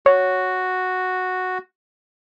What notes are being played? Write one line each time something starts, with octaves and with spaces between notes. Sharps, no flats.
F#4 C#5